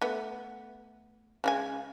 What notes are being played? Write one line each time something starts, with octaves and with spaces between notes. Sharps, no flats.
A3 B3
C#3 G#3 G#5